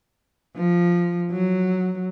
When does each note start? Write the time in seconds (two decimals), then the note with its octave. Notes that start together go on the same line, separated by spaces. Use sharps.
0.56 F3
1.30 F#3